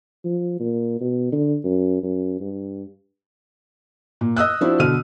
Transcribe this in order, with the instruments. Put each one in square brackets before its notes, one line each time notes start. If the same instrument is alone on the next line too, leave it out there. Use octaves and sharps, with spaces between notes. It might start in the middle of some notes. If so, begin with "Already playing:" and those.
[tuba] F3
A#2
B2
D3
F#2
F#2
G2
[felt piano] A#2
D#5 D#6 E6 F#6
F3 C4 D4 E4 F#4
B2 D3 F6 D#7